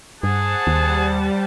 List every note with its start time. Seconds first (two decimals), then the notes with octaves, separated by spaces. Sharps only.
0.23 G2 G#4 C5 F#5 A5
0.67 D#2 G3